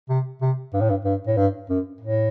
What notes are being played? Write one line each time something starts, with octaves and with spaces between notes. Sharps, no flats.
C3
C3
G2
A2
G2
G2
A2
G2
F#2
A2